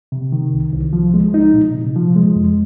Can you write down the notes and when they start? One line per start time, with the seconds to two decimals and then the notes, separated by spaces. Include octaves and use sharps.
0.12 C3
0.32 D#3
0.53 C2
0.73 C2
0.93 F3
1.14 G#3
1.34 D#4
1.54 A#2
1.74 C3
1.96 F3
2.16 G#3
2.36 F2